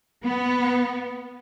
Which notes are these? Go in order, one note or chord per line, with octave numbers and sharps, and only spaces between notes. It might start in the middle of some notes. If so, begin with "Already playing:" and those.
B3